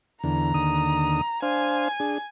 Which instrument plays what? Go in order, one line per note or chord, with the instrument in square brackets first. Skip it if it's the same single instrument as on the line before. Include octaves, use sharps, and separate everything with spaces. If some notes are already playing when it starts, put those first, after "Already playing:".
[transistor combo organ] E2 D3 [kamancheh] A#5
[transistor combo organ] D#2 D3 D#6
[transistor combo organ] D4 C5 F5 [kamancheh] G#5
[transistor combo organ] D4 G#4